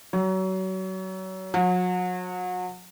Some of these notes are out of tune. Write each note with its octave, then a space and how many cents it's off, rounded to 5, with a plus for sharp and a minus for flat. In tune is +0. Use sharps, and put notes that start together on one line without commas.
F#3 +30
F#3 -35